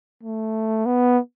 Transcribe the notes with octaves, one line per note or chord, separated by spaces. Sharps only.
A3
B3